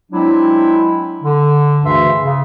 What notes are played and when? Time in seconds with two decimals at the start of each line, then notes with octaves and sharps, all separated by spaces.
0.11 F#3 G#3 C4 D4 E4
1.23 D3
1.83 D2 G2 C#3 E3 E5 C6
2.21 C#3